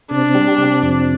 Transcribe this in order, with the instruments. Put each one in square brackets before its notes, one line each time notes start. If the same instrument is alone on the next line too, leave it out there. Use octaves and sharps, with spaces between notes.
[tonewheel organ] C3 [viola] D4
[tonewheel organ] G3
C3
F2